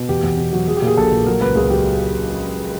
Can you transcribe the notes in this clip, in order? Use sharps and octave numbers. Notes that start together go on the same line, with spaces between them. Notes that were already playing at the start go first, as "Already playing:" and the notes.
Already playing: B2
E2 G4
E2
B2
F#3
F#3 G#4
G4
A#2 G#4
A#1 A4
A#2
F#3 A#4
C#2 B4
C#2 G#4
F#3 G4